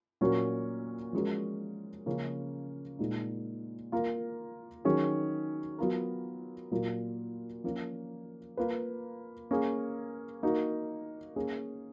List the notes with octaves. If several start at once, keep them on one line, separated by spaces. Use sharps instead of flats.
A#2 F#3 C#4 F#4 A#4
F3 G#3 C#4 F#4 A#4
C#3 F3 A#3 C#4 G#4
A#2 G#3 D#4
A#3 F4 A#4
D#3 F#3 C#4 G#4
F#3 B3 F4 A#4
A#2 F#3 A#3 F4 A#4
F3 A#3 C#4
A#3 F4 B4
A#3 C#4 G#4
A#3 D#4 F#4 A#4
A#3 C#4 G#4